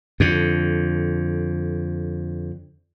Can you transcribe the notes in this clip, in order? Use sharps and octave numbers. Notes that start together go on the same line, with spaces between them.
F2 D3